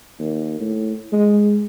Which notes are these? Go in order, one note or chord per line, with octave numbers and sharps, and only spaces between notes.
D#2
A2
G#3